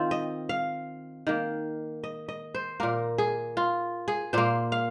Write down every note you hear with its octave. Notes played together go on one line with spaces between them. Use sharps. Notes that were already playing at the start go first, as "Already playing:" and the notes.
Already playing: D#3 C4 F4
D#5
F5
D#3 A#3
D#5
D#5
C5
A#2 A#3 A#4
G#4
F4
G#4
A#2 A#3 C5
F5